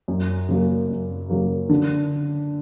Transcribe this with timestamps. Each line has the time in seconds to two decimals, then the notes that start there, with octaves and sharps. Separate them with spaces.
0.08 F#2
0.49 C#3 F#3 A#3
0.89 F#2
1.30 C#3 F#3 A#3
1.70 D3